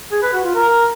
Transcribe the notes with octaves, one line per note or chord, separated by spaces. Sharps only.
G#4
B4
F#4
F4
A#4